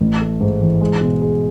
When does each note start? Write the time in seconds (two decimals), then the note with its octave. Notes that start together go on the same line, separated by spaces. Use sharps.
0.01 A1
0.21 A3
0.41 G#2
0.61 E3
0.81 G#3
1.01 B2
1.22 G#4